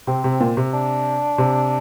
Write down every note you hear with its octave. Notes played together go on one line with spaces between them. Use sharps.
C3 C4
C3
A#2
C3
D4
C3